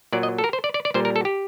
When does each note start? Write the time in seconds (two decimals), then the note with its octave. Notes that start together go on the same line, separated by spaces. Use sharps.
0.13 A#2 F#3 D5
0.23 D#5
0.38 A4
0.44 A#4
0.53 C5
0.64 D5
0.74 D5
0.85 D5
0.94 A#2 G3 C5
1.05 A#4
1.16 A4
1.25 G4